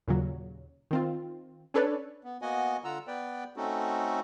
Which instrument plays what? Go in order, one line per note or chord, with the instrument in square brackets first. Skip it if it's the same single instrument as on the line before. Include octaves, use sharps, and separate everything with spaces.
[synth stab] D#2 A#2 C#3 F#3
D#3 C4 F4
C#4 D4 A4 B4 C#5 D5
[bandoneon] B3
A#3 B3 F#4 D#5 F#5 G#5
D3 F4 F#5 A#5 E6
B3 B4 D5 G5
A3 C4 C#4 D#4 F#4 A4